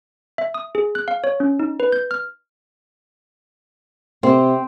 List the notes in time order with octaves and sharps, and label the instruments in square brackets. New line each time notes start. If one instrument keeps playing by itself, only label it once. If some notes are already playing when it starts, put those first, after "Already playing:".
[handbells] E5
D#6
G#4
F#6
F5
C#5
C#4
D#4
B4
G6
F6
[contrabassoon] C3 [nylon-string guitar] C4